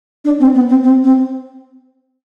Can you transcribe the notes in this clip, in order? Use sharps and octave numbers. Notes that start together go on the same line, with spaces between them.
D4
C4
B3
C4
C4
C4